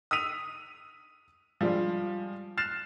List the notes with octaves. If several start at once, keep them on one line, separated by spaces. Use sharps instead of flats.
D#6 E6 B6 D#7 F7
F3 G3 G#3 D4 F4
F6 F#6 A6 C7 E7